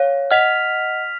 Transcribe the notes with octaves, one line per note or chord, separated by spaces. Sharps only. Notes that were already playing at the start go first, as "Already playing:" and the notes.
Already playing: C#5 F5
D#5 F#5 F6 B6 F7